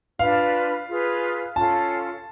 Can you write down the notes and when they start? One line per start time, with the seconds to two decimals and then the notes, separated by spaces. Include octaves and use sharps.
0.19 D4 F4 B4 F5
0.88 F4 G#4 B4
1.56 C#4 F4 A4 F5 A5